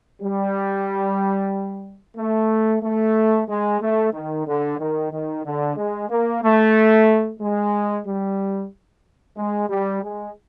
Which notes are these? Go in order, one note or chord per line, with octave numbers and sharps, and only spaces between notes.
G3
A3
A3
G#3
A3
D#3
D3
D#3
D#3
D3
G#3
A#3
A3
G#3
G3
G#3
G3
G#3